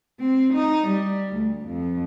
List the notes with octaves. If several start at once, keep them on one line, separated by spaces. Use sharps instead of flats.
C4
D#4
G3
D2
F2